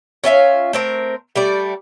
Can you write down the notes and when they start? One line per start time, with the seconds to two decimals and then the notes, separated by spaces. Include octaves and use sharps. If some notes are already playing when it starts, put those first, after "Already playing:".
0.24 C#4 F4 E5 F5
0.73 A3 C4 A#4
1.36 G3 A3 D5